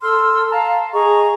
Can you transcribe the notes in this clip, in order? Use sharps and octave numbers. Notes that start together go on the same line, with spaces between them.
A4 C6 E6 F6
F5 A5 A#5
G#4 D#5 A#5 C#6